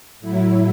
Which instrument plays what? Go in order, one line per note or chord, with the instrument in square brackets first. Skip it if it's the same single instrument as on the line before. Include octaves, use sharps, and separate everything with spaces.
[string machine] A2 F#3 E4